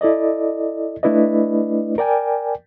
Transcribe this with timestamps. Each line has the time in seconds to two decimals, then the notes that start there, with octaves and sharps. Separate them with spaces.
0.01 E4 A4 D5 D#5
1.03 A3 D4 E4 B4 D5 D#5
1.98 A#4 D5 G5 G#5